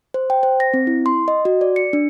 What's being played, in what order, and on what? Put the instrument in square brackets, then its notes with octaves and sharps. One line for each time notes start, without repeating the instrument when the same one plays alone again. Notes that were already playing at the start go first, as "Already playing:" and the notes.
[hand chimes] C5
G5
C5
A#6
C4
E4
C6
D#5
F#4
D5
C#7
D4